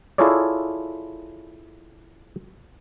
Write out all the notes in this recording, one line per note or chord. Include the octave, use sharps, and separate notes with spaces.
E4 F4 G#4 A4 C#5 D5